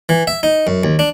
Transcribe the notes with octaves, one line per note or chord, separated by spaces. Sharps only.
E3
E5
D#4
F#2
D#2
D4